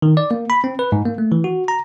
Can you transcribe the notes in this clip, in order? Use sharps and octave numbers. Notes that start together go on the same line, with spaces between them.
D#3
D5
A#3
B5
C4
B4
G#2
A#3
A3
E3
F#4
A#5